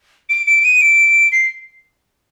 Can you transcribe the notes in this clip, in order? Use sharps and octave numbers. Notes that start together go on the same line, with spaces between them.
D7
D7
D#7
D7
C7